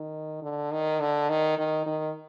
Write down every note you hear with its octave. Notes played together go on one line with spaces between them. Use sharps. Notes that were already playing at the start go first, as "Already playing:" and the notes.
Already playing: D#3
D3
D#3
D3
D#3
D#3
D#3